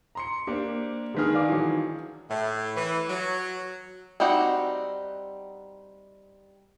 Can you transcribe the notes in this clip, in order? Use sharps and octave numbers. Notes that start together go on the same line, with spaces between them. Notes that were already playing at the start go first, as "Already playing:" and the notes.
A#5 C6 C#7
A#3 D4 G4 C5
D3 D#3 G#3 G#4 B4 F6
D5 F5 D6
E3 F#3
A2
E3
F#3
G3 C4 D#4 F#4 F#5